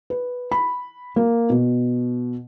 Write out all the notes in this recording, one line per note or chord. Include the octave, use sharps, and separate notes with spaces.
B4
B5
A#3
B2